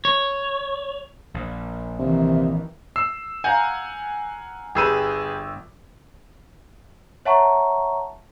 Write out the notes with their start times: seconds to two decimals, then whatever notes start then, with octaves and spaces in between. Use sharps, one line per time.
0.05 C#5
1.34 A#1
1.99 C3 D#3 E3
2.96 E6 C7
3.44 F5 F#5 G#5 A#5 G6
4.75 G1 G4 G#4 B4 E6 D#7
7.25 C#5 E5 F#5 A5 A#5 C#6